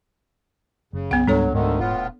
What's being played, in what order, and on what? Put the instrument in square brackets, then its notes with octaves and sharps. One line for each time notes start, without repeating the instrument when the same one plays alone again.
[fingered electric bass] F#1 [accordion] C#3
[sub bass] B1 [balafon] B3 F#5
[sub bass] C#2 [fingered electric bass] G#2 G3 [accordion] F#3 [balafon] D4 A4 C#5
[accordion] D2 D3 D#3 [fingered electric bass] G#2
[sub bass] D#1 [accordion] A2 B3 F4